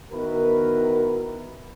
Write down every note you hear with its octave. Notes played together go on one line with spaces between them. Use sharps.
D#3 B3 E4 F#4 A#4 B4